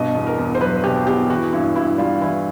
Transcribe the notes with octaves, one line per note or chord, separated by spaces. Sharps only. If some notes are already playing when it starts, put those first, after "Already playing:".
Already playing: G2 B2 D#5
E2
A#4
E2
C5
F#3 B4
B2 G4
E2 G4
E3 F#4
G2 E4
G2 E4
G3 F4
E3 E4